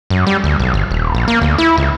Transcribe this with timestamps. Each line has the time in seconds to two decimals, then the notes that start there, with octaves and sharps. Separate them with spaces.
0.10 F#2
0.27 G3
0.44 D2
0.60 B1
0.74 G1
0.91 D#1
1.15 A#1
1.28 A#3
1.41 D2
1.58 E4
1.78 C#2